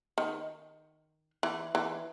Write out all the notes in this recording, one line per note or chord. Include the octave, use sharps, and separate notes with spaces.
D#3
E3
E3